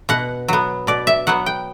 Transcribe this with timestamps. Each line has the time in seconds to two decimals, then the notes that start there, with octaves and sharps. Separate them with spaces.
0.09 B2 F#5
0.48 F#3 B3
0.87 B2 D5
1.07 E5
1.27 F#3 B3 F#5
1.46 G5